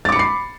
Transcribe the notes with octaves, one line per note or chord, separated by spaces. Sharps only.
B5 D6 A6 C7 C#7